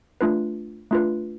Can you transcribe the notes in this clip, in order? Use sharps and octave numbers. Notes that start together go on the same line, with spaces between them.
A3 D4 F4 B4
A3 D4 F4 B4